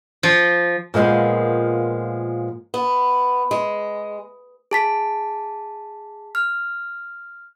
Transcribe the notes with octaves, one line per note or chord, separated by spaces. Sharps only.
F3
A#2 F3 G#3 A#3 B3
B3
G#3
G#4 A5 B6
F6